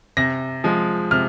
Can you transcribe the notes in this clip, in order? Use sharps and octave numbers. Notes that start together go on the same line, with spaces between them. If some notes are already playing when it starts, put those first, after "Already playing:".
C3 A#6
F3 G#3
C3 F6